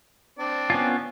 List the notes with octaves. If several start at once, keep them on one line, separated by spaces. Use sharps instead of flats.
C4 D4 D5
B3 C#4 F4